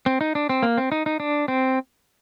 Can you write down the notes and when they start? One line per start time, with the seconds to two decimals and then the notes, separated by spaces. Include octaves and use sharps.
0.06 C4
0.21 D#4
0.35 D4
0.49 C4
0.63 A#3
0.78 C4
0.92 D#4
1.06 D#4
1.20 D4
1.48 C4